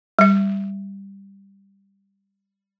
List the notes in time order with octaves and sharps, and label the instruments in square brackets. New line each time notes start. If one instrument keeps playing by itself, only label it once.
[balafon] G3 E5